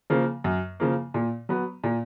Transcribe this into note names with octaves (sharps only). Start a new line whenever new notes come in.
C#3 F3 A#3
F#2
C#3 F3 A#3
A#2
F#3 B3
A#2